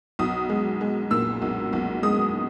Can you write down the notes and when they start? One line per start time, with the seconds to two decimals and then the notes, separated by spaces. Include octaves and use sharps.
0.19 B1 D#6
0.49 G#3
0.81 G#3
1.10 A#2 E6
1.42 B1
1.73 B1
2.03 G#3 D#6